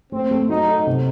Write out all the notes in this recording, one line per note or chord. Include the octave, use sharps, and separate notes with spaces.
A3 C4
A3
F#3 D#4
A4
C3